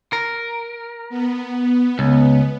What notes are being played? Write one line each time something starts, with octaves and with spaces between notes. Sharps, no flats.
A#4
B3
C#2